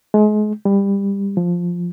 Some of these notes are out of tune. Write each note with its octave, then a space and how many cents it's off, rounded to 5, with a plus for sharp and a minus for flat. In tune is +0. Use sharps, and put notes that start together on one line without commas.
G#3 +30
G3 +20
F3 +5